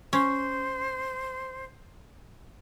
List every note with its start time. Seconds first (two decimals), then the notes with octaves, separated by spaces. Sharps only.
0.13 C#4 C5